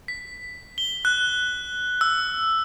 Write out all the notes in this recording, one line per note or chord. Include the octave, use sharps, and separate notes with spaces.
B6
G7
F#6
E6